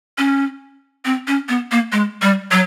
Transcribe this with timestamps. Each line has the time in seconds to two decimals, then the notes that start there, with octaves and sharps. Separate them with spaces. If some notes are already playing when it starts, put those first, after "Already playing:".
0.18 C#4
1.05 C4
1.28 C#4
1.49 B3
1.72 A#3
1.92 G#3
2.22 G3
2.51 F#3